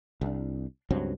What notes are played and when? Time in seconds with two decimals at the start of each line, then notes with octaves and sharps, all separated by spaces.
0.21 C2 D4
0.90 C#2 G2 F#3 C4